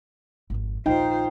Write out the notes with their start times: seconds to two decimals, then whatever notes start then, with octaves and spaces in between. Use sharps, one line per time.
0.50 G#1 F2
0.86 A#1 D#2 D#4 F4 C5 G5